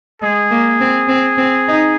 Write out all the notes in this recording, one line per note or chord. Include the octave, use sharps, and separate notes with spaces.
G#3 G#4
A#3
C4
C4
C4
D#4